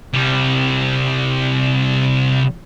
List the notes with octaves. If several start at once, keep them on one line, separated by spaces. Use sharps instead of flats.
C2 G3